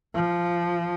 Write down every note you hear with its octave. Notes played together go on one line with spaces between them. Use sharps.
F3